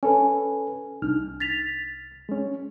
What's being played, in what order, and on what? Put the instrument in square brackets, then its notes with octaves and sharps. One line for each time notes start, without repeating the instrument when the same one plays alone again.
[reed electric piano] C#4 A4 B4 [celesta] G#5
[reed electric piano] C2 F6 [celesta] D4 D#4
[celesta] A6 B6 F7
[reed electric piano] G#3 C#4